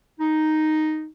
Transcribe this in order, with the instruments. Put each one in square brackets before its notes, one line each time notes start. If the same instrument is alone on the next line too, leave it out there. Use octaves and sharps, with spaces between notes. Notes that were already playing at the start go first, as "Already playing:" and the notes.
[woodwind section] D#4